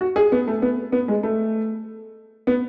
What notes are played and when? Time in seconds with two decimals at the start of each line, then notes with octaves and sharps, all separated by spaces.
0.01 F#4
0.16 G#4
0.32 B3
0.47 A3
0.62 B3
0.92 B3
1.08 G#3
1.23 A3
2.47 B3